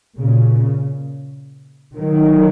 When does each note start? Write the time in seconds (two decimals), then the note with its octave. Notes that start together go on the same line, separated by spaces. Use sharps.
0.18 A#2 C#3
1.96 D#3 F#3